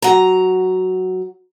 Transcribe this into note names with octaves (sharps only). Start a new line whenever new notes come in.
F#3 A#5